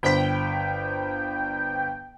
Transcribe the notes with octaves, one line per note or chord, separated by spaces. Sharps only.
G1 C5 G5 B5 B6